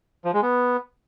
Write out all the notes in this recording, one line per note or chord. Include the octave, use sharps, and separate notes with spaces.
F3
G#3
B3